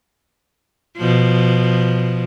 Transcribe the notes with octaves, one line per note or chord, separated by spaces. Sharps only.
B2 F3